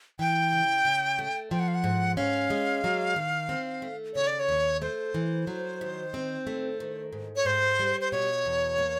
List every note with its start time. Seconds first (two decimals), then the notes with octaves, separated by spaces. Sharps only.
0.19 E3 G5
0.53 C#3
0.85 C#3
1.19 A3
1.51 F3 G5
1.60 F#5
1.68 F5
1.75 F#5
1.84 G#2
2.17 C#4 F5
2.50 G#3
2.84 F#3
3.16 D#3
3.49 C4
3.82 A3
4.15 C#3 C#5
4.27 D5
4.40 C#5
4.49 D#2
4.82 A3 C5
5.14 E3
5.47 F#3
5.81 D#3
6.14 C4
6.47 A3
6.80 D#3
7.12 G#2
7.36 C#5
7.45 G#2 C5
7.79 G3
8.01 C5
8.12 B2 C#5
8.45 E2
8.78 A#3